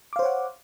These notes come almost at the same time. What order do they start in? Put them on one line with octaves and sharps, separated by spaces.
D6 F5 C5 C#5 F#5